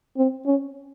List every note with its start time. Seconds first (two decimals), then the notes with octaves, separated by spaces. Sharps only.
0.17 C4
0.46 C#4